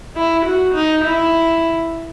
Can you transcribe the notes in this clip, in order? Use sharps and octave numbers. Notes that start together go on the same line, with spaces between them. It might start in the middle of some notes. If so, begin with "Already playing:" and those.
E4
F#4
D#4
E4